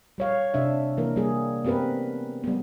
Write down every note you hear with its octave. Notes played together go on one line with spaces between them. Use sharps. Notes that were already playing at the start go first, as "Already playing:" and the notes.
G3 C#5 F5
C3 D4 E5
E3 A#3 A#4
G3 A#3 G#4
B3 C4 G4 A#4 B4
G3 B3